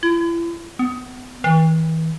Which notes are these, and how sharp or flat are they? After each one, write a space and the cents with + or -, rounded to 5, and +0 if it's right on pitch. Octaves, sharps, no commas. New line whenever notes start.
E4 +40
B3 +30
E3 -40